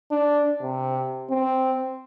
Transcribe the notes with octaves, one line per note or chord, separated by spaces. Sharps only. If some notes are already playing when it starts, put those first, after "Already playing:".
D4
C3
C4